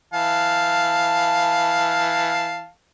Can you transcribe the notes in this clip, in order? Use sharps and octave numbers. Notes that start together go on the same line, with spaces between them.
E3 F5 A5